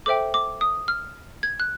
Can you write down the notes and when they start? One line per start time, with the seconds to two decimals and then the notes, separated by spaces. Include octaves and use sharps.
0.06 A4 C5 E5 G5 D6
0.34 D6
0.61 D#6
0.88 F6
1.43 G#6
1.60 F#6